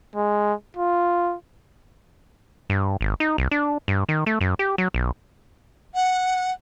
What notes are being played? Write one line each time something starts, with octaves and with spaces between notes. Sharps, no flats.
G#3
F4
G2
G#1
D#4
C2
D4
G2
D#3
A3
F#2
G4
F#3
B1
F#5